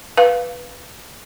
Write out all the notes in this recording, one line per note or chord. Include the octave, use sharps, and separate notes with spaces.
B4 F5